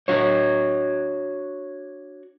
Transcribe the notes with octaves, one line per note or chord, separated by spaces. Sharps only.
D4 F#4 C#5